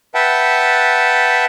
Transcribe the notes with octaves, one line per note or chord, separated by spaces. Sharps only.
B4 E5 F#5 G5 A5